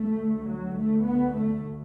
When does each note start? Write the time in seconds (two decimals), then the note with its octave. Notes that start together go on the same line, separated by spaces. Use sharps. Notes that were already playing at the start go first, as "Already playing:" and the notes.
Already playing: D2 A3
0.46 F#3
0.76 A3
1.05 B3
1.34 A3